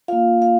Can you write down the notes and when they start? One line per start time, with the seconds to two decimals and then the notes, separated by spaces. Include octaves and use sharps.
0.08 A#3 F4 F5
0.42 F5